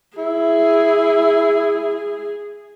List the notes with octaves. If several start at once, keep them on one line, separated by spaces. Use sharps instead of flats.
E4 G#4